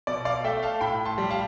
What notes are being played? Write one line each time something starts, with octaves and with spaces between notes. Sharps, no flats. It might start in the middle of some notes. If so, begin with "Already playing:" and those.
B2 D5
D5 F5
A3 E5 G5
F5 A5
A2 G5 B5
A5 C6
G3
F5 A5